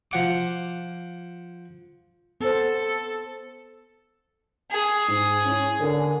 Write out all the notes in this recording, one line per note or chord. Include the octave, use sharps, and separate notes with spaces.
F3 F#5 D6
B3 A4 C5
G#4
G#2
C#4 E4
D3 A#4 G#5